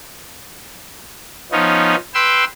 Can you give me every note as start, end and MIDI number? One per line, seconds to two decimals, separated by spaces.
1.52 1.95 53
1.52 1.95 59
1.52 1.95 61
1.52 1.95 63
2.14 2.44 71
2.14 2.44 79
2.14 2.44 84
2.14 2.44 88